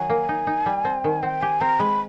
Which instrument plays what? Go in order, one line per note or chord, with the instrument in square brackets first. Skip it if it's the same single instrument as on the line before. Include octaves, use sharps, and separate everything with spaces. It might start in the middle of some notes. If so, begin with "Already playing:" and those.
Already playing: [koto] D#3 F#3 [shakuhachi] G#5
[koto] A#3
D#4
D#4
G3
C4
D#3
[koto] C4 [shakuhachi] G5
[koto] G4 [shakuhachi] G#5
[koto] C4 [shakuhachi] A#5
[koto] G#3 [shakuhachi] B5